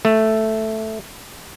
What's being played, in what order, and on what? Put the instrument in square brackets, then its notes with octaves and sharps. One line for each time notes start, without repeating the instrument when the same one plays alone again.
[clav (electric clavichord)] A3